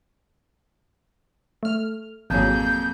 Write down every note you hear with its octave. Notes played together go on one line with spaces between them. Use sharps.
A3 F6
G#1 F2 A#2 F#3 G#4 G6